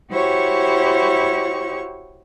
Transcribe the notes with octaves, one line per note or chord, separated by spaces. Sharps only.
E4 F#4 G4 C5 C#5 C#6